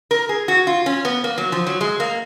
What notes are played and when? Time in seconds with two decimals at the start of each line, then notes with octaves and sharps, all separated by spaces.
0.11 A#4
0.29 G#4
0.48 F#4
0.67 F4
0.86 C#4
1.05 B3
1.24 A#3
1.38 F#3
1.52 F3
1.67 F#3
1.81 G#3
2.00 A#3